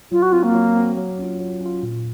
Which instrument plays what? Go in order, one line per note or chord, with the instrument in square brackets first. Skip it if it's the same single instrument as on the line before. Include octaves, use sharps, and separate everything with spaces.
[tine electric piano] F#3 [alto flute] F4
[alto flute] F#4
[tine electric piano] C4 F#4 [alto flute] F4
[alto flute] A#3
[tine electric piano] F#3
C4 F#4
F#3
C#4 F4
F#3
C#4 F4
A#2